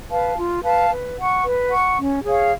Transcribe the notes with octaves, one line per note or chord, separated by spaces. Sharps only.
B4 F5 A5
F4
B4 F5 A5
B4
F#5 C#6
B4
F#5 C#6
C#4
G#4 C#5 F5